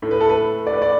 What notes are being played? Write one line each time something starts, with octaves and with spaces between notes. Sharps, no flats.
A2 A3
B4
A4
B4
D5
B4
D5